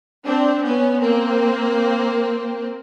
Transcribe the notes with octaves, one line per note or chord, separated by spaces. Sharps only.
C4 D4
B3 C#4
A#3 C4